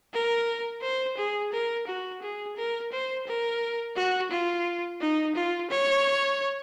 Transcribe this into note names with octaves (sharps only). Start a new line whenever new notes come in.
A#4
C5
G#4
A#4
F#4
G#4
A#4
C5
A#4
F#4
F4
D#4
F4
C#5